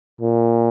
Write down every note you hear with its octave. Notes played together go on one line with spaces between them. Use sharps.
A#2